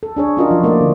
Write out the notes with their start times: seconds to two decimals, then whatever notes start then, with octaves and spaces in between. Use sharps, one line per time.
0.03 A4
0.17 D4 G#4 C#5
0.37 C#4 D4 F4 F#4 A#4 D#5
0.51 F3
0.63 A3 A#3 E4 D5
0.81 D3